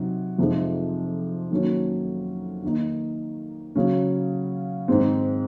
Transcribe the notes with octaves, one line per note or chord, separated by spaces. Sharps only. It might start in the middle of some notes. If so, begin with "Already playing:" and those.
Already playing: C3 F#3 D#4
F2 C3 F3 G#3 D#4
D#3 F#3 A#3 C#4
D#3 A#3 D#4
C#3 F#3 C#4
G#2 D#3 G#3 C4